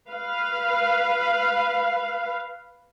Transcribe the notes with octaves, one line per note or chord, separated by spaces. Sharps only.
B4 F5